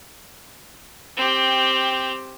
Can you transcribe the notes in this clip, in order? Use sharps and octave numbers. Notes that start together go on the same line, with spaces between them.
C4 G4